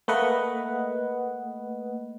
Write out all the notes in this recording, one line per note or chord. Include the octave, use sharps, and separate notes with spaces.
A3 A#3 B4 D#5 F#5